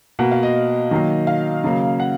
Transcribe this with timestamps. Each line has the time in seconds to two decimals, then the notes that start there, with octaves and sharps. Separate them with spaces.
0.19 B2 A#3 F#5
0.32 F5
0.43 D#5
0.91 D#3 F#3 A#3
1.27 F5
1.64 C#3 F#3 A#3
2.00 F#5